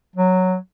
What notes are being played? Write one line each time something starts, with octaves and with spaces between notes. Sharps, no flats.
F#3